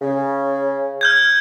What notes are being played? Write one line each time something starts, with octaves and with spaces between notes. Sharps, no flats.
C#3
F6 G6 G#6